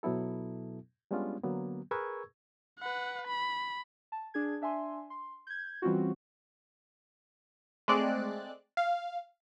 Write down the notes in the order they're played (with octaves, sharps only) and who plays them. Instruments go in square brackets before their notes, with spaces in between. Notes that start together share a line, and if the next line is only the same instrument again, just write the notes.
[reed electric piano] B2 F#3 B3 E4 A4
G3 G#3 B3 C#4 D4 F4
D3 F#3 A#3 B3
G#4 A#4 B4 C#6 E6 G#6
[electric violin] B4 F#5
B5
[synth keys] A5
D4 G#4 G#6
D4 E5 G#5 C6
C6
G6 G#6
E3 G3 C4 C#4 F4 F#4
[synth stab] G#3 A3 C4 D5 F#6
F5